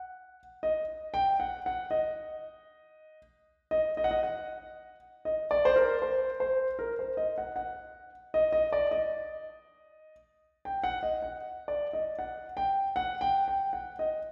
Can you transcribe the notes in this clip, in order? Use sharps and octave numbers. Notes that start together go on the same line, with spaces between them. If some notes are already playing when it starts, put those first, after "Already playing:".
Already playing: F#5
D#5
G5
F#5
F#5
D#5
D#5
D#5
F#5
D#5
F#5
D#5
D5
C5
A#4
C5
C5
A#4
C5
D#5
F#5
F#5
D#5
D#5
D5
D#5
G5
F#5
D#5
F#5
D5
D#5
F#5
G5
F#5
G5
G5
F#5
D#5